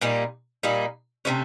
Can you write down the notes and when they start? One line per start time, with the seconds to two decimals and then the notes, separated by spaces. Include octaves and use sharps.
0.01 A#2 G3 A#3 D#4
0.63 A#2 G3 A#3 D#4
1.25 C3 E3 A3 C#4